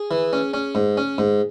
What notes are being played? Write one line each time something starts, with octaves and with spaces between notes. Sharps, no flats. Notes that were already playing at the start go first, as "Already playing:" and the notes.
Already playing: G#4
E3
C#4
C#4
G#2
C#4
G#2